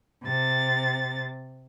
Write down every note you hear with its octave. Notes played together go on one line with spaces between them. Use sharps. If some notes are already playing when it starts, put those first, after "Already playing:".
C3 A6